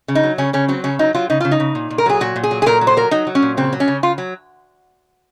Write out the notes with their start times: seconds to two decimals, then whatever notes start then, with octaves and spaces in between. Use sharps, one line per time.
0.08 C#3
0.15 D#4
0.23 F#3
0.38 C#3 C#4
0.53 C#3 C#4
0.69 F#3 C4
0.84 C#3 C#4
0.99 F#3 D#4
1.15 F#3 F4
1.30 C#3 D#4
1.41 C#3 F4
1.51 D#4
1.60 C#3
1.75 A#2
1.90 A#2
1.98 A#4
2.06 F#3 G#4
2.21 A#2 F#4
2.36 A#2
2.44 G#4
2.51 F#3
2.62 G#4
2.66 A#2 A#4
2.81 F#3
2.87 C5
2.97 F#3 A#4
3.11 F#3 D#4
3.27 F#3
3.35 C#4
3.42 A#2
3.57 C#3 C4
3.73 F#3
3.80 C#4
3.88 C#3
4.03 C#3 F4
4.18 F#3